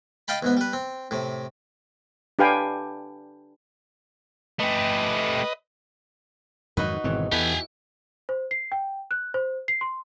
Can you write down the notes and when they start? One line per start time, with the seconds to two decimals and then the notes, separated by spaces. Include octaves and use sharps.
0.28 D#5 F5 G5 A5 B5
0.43 E2 G#2 B3
0.57 G3 B4
0.73 C4
1.11 A2 C3
2.39 D4 G4 B4 F5 G5 G#5
4.60 A3 G4 B4 D#5
6.77 F2 G#2 D#3 F#3 D#4 F#4 B4
7.04 G#1 B2 D3 E3 C4 C#5
7.32 E2 E3 B3 E4 G4 A4 G#5
8.29 C5
8.51 C7
8.72 G5
9.11 F#6
9.34 C5
9.68 C7
9.81 C6